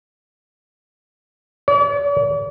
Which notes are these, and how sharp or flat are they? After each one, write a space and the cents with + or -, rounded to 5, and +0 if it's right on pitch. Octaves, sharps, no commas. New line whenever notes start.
D5 -45